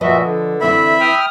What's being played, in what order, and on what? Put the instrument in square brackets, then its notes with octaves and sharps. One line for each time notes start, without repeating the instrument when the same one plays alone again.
[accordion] A#2 F#4 E5 [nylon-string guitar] F3 B4 D#5
[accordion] D3
[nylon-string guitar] E3 C4 E4 [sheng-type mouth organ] E5 B5
[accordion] G5 D#6 F6